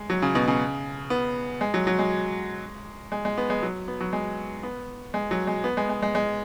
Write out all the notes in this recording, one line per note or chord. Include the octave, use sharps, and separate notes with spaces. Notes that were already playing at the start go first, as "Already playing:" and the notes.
Already playing: G#3
F#3
C#3
B2
C#3
B3
G#3
F#3
F#3
G#3
G#3
G#3
B3
G#3
F#3
B3
F#3
G#3
B3
G#3
F#3
G#3
B3
G#3
G#3
G#3
G#3